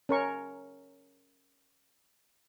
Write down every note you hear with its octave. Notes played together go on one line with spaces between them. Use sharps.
C#4 A#4 C#6